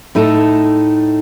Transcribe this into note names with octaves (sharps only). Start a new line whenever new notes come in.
A2 A3 D#4 A4